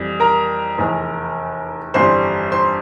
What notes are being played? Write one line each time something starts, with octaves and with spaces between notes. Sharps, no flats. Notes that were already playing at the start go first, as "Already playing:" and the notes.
Already playing: F2 E3 G3
A#4 A#5
F1 E2 E3
G1 F2 E3 G3 C5 C6
C5 C6